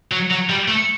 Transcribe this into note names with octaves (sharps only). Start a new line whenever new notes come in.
F#3
F#3
G3
A3